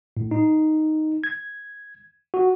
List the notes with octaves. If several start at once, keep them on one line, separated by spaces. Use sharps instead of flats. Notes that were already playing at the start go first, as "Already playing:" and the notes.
A2
D#4
G#6
F#4